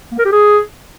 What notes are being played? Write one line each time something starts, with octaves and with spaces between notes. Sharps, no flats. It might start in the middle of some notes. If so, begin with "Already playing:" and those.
A#3
A#4
G4
G#4